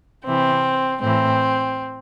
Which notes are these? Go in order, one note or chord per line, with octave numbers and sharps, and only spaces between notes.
C3 E3 C4
A2 E3 C4